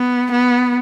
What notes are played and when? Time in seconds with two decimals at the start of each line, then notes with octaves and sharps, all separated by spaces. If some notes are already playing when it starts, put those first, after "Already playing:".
Already playing: B3
0.32 B3